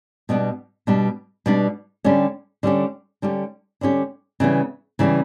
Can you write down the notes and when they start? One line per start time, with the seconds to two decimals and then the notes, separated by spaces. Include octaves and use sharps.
0.29 B2 G3 B3 D4
0.87 B2 G3 B3 D4
1.46 B2 G3 B3 D4
2.04 D3 G3 C#4 G4
2.63 D3 G3 C#4 G4
3.22 D3 G3 C#4 G4
3.81 D3 G3 C#4 G4
4.40 C#3 E3 G3 B3
4.99 C#3 E3 G3 B3